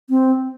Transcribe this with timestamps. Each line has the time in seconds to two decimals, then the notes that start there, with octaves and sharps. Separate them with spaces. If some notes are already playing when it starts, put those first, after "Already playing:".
0.10 C4